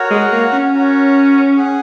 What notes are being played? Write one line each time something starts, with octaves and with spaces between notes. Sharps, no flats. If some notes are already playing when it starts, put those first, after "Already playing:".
Already playing: F#4 A#4 C#5 F#5
G#3
A#3
C#4
F#4 A#4 C#5 F#5
G#4 F#5